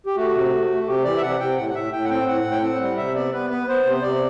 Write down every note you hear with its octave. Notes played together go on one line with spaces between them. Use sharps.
G4
A3 F#4
C3
A3
A3
C3 G4
E3 D5
E5
C3 F#5
C3 G5
A2 F#5
F#5
A2 E5
A2 G5
F#5
C4 G5
A2 F#5
A2
G5
C4 F#5
G3
C3 E5
B3 D5
B3 B4
B3 B4
B3 C5
C3
C5
C3 D5